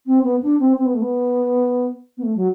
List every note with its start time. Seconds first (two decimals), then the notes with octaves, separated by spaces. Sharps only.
0.06 C4
0.23 B3
0.43 D4
0.60 C4
0.78 C4
0.86 B3
0.94 A3
1.02 B3
2.17 B3
2.23 A3
2.36 F#3